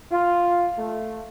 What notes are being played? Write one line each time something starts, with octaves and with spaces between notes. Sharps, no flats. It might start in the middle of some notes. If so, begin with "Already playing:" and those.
F4
A3